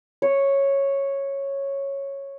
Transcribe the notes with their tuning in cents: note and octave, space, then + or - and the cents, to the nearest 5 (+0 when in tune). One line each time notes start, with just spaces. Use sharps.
C#5 -5